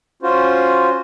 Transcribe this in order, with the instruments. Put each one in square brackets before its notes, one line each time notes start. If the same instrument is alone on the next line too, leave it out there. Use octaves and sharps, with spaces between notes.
[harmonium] C#4 F4 F#4 C5